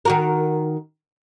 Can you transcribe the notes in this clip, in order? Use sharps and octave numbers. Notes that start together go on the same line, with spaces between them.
D#3 F#4 A#4